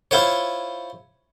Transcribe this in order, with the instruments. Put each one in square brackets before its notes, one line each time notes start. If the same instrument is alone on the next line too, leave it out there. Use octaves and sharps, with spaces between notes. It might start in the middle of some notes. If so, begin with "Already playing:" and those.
[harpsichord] E4 F4 C5 C#5